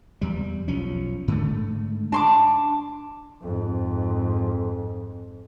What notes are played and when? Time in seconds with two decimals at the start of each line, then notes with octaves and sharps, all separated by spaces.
0.21 E2 G3
0.68 B1 F3 C#4
1.28 G#2 D3 A3
2.12 D4 A5 C6 D6
3.42 F2 G#2